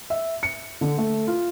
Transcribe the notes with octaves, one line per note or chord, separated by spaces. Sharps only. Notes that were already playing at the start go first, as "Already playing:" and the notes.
E5
C#7
D3
A3
F4